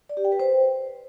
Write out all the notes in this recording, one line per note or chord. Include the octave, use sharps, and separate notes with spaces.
D5
G4
G5
B4
C5